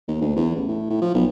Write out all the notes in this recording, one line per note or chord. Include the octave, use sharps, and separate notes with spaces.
D#2
D2
E2
A1
A2
A2
F3
B1